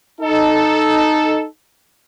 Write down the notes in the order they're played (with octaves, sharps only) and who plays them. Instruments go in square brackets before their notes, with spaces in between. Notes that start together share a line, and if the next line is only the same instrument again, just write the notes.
[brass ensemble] D#4 A4